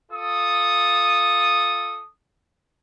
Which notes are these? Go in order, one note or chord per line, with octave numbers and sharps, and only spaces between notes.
F4 A4 D#6